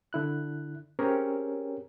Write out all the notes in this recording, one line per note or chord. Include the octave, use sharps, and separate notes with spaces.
D3 E4 F#6
C4 C#4 G4 G#4 A#4 C#5